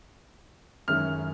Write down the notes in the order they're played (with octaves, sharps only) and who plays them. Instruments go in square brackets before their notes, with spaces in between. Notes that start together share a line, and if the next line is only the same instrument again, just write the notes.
[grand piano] F#2 D#3 G#3 C#4 E4 F6